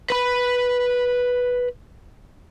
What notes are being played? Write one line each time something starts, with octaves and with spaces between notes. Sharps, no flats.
B4 B5